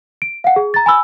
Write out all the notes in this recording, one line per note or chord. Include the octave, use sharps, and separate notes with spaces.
D7
F5 F#5
G#4
A#5 A6
G#5 B5 E6